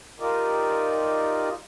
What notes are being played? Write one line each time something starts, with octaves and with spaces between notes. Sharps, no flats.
D#4 F4 G4 A#4 D5 D#5